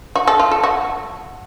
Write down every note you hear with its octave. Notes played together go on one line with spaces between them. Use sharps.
F#4
A4
F4
A4
F#4